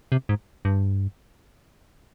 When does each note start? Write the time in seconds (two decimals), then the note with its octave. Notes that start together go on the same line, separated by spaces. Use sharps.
0.12 C3
0.29 G#2
0.65 G2